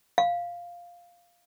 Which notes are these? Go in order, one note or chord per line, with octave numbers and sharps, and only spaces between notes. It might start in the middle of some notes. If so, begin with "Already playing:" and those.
F5